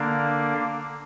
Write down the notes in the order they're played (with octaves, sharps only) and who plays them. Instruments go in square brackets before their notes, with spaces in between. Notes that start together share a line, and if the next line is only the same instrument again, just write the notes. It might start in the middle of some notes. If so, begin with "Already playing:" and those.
Already playing: [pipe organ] D3 A#3 D4